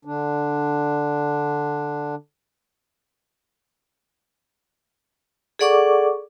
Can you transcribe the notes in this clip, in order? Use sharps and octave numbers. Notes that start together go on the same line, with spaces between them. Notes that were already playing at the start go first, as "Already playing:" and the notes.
D3 D4
G#4 A4 D5 F#5 C#6 D6